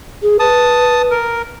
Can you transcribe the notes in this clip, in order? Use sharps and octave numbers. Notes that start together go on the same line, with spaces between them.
G#4
B4 A5 D#6
A#4